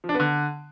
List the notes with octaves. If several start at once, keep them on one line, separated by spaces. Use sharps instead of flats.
F3
D4
B3
D3